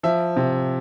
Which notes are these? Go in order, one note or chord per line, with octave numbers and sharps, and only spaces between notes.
F3 E5
C3